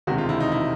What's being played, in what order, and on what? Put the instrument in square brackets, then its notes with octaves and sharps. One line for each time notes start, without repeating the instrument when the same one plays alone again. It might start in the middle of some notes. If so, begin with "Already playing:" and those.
[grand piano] E1 D2 C3 D#3 G#3 F#4
F4
E4
D#4
E4